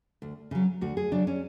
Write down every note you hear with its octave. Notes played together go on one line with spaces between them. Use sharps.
D2
C#3 F#3
D2 F#4
G#4
C#3 F#3 D4
C#4